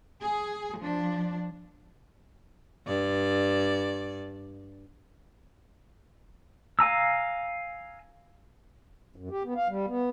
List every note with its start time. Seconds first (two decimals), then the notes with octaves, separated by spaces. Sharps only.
0.22 G#4
0.79 F3 D4
2.86 G2 D5
6.79 F5 G#5 A#5 E6
9.16 F#2
9.31 G4
9.44 B3
9.56 F5
9.68 G3
9.87 B3